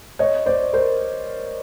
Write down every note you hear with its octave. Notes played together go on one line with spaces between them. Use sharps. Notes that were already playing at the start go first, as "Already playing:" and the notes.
C#5 D#5
C5 D5
A#4 C5